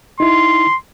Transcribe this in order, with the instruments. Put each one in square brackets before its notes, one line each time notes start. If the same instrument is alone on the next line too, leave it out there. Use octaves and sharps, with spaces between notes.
[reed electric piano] D#4 E4 [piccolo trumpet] C6